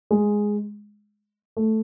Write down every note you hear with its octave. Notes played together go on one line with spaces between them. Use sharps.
G#3
A3